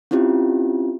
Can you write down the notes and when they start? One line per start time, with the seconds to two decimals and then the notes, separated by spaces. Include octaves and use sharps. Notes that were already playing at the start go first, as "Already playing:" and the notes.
0.11 C4 C#4 E4 F4 G4